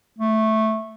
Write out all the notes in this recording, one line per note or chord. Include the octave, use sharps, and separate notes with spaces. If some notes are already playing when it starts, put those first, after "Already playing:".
A3